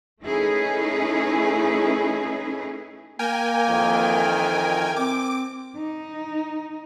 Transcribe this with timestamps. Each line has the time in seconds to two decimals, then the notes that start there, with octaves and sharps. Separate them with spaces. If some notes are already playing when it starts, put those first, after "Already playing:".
0.22 A3 C#4 D#4 E4 G#4 B4
3.19 A#3 A#4 G5 G#5
3.69 F2 D#3 E3
4.96 C4 D6
5.77 D#4